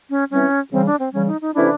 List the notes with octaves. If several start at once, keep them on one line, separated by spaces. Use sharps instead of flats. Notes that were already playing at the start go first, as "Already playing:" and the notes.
C#4
E3 G3 C4 C#4
C#3 E3 G3 C4
D4
C4
C#3 E3 G3 C#4
D#4
D#4
C3 E3 A3 C#4 D4 E4